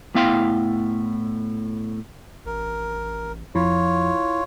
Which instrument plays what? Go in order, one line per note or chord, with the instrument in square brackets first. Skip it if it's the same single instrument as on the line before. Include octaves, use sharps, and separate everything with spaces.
[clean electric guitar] A2 B3 E4 F5 G5 C6
[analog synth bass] A1 [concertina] A#4
[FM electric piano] F2 F3 [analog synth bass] E4 [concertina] F4 C#5